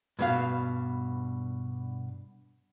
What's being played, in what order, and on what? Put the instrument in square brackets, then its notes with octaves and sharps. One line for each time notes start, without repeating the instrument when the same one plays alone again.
[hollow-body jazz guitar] G2 B2 F5